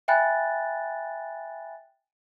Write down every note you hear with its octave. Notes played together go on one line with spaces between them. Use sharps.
E5 G5 G#5 B5 F#6 A6